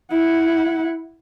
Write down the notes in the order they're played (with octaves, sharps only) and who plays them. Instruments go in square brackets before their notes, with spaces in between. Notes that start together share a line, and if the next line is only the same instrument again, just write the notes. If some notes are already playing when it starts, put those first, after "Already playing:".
[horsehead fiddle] E4 F#5